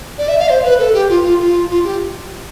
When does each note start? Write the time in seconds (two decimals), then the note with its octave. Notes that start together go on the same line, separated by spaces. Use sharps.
0.18 D5
0.28 E5
0.39 F5
0.49 C5
0.64 B4
0.79 A4
0.94 G4
1.09 F4
1.24 F4
1.39 F4
1.69 F4
1.84 G4